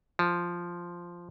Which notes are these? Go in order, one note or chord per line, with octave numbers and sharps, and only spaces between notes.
F3